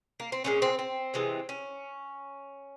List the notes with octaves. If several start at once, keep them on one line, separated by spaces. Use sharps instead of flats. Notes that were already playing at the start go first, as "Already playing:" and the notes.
A#3
C4
A#2 F3 G#3 C#4
C4
C4
C3 E3 G#3
C#4